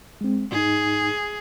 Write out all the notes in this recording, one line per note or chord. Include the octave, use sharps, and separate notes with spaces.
G#3 C4
G#2 D#4 G#4